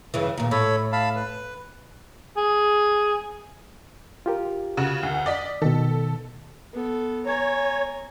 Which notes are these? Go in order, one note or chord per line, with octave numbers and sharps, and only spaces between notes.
G2 C#3 E3
D#2 A#2 D#4
A2 A4 C#5 B5
F5 A5 B5
B4
G#4
F4 G4 A#4
C#3 F#4
D2
D5 D#5 B6
B2 D#3 A4
B3 A4
C#5 G#5 A#5